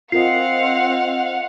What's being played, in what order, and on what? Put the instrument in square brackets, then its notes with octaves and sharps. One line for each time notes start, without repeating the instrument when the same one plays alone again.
[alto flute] C4 [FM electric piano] F4 A#4 D#5 [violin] F5 F#5 [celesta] C7